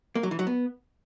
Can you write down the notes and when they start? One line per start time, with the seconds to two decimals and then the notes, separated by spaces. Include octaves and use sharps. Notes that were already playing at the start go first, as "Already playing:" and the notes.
0.15 A#3
0.23 F#3
0.31 E3
0.39 F#3
0.47 B3